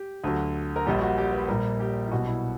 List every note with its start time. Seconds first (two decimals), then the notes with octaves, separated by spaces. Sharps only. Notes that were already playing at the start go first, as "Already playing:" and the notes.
Already playing: G4
0.24 D2 D3 F#3
0.76 A#4
0.86 A#1 A#2 G3 G4
1.02 F#4
1.18 G4
1.33 B4
1.48 A#1 A#2 G3 A#4
1.80 G4
2.06 E4
2.12 B1 B2 G3 F#4
2.27 E4